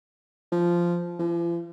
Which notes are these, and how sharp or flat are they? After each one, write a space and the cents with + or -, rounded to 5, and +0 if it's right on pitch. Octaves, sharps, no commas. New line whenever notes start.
F3 -10
F3 -45